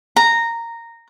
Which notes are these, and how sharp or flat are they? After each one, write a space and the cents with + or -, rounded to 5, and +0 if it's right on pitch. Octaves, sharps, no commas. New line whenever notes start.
A#5 -10